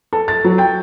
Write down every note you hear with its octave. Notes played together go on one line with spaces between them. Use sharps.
A4
A6
F#3
G5